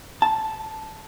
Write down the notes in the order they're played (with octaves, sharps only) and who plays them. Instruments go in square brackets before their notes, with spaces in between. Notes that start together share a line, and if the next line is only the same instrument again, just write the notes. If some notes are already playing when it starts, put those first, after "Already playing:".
[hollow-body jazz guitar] A5